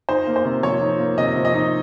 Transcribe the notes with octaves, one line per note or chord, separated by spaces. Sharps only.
D#4 C5
A#3
C5
C3
F3 C#5
D#4
A#3
C3 D#5
F3
D#5
D#4